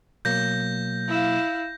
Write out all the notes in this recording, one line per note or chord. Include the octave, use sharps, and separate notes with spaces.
B2 F#3 A#3 G6 A#6
E4 F5